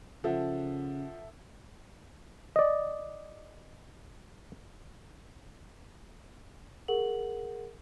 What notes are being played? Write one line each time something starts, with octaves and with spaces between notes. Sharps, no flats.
C#3 F3 A4 E5 F#5
D5 D#5
G#4 A#4 F#5 F#7